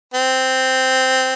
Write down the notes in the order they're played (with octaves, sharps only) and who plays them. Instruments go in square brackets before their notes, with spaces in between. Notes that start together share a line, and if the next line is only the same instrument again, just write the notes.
[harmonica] C4